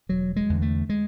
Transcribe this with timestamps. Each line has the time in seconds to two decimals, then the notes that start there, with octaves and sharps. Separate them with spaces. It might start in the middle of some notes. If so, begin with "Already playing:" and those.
0.09 E1 F#3
0.36 G#3
0.49 E2 D3
0.62 A3
0.89 G#3